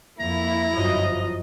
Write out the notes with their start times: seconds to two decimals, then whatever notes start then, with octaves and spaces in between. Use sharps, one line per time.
0.20 F2 A#3 E4 A#5
0.74 G1 F#2 F3 F#3 D#5